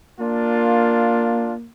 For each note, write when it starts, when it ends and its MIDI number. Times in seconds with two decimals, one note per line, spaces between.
0.20 1.69 58
0.20 1.52 62
0.20 1.52 65